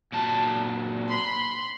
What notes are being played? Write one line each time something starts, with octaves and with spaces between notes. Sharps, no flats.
A#2 F#3 A5
B5 C6